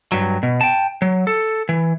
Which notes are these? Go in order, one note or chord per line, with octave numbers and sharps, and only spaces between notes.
G2 F#3
B2
G5 A5
F#3
A4
E3